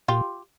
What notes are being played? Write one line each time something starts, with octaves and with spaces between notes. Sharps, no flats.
A#2 F4 G4